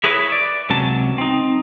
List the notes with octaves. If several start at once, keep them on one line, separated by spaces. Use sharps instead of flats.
E4 G#4 A#4 B4 C#5 E5
D5
C#2 C3 F#3 C#4 A5
C4 D#4